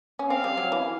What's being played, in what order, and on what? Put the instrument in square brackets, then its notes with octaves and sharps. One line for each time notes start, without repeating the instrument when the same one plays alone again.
[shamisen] C#4
[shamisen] C4 [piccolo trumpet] F5
[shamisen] G3
F#3
E3